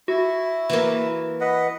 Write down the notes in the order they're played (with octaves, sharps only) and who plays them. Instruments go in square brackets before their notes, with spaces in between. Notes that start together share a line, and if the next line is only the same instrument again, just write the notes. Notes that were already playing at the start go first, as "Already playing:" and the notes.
[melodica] E4 [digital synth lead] F#4
[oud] E3 A#3
[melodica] B4 D#5 F#5